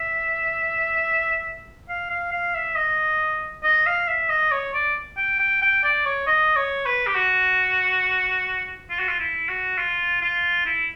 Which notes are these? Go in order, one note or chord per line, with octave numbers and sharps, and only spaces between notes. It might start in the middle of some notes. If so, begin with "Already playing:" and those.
Already playing: E5
F5
F5
F5
E5
D#5
D#5
F5
E5
D#5
C#5
D5
G5
G5
G5
D5
C#5
D#5
C#5
B4
G4
F#4
F4
F#4
F4
E4
F#4
F4
F4
E4